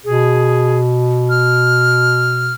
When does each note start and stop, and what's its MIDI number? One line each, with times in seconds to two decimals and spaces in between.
0.05 2.55 47
0.05 0.80 68
1.30 2.54 89